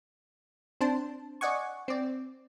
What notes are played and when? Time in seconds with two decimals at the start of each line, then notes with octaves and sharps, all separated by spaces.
0.81 C4 D4 C5 A5
1.41 D5 D#5 F#5 G#5 C#6
1.88 C4 D5